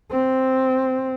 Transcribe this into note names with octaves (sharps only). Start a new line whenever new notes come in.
C4